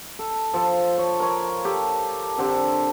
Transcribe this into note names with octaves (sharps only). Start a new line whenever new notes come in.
A4
F3 A4
C#5
A#4 C#5
G4 A4
D3 C4 G4 A4